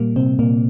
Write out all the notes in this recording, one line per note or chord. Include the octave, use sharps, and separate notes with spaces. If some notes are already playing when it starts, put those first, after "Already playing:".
Already playing: A#2 G3 A#3
C3 C4
A#2 A#3